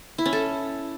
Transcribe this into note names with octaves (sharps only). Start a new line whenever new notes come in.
E4
C#4
A4